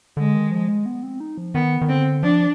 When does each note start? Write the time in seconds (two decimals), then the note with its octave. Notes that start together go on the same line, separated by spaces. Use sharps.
0.17 D3 G#3
0.34 D#3
0.51 F3
0.68 G#3
0.86 B3
1.03 C4
1.20 D#4
1.38 F3
1.54 D#3 B3
1.81 D#3
1.89 D3 C4
2.23 F3 D4